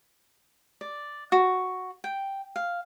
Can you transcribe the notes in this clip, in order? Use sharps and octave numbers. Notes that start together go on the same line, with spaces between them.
D5
F#4
G5
F5